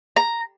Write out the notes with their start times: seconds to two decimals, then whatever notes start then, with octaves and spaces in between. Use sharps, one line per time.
0.16 A#5